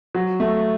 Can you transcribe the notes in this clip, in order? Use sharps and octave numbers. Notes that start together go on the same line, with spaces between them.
F#3
A3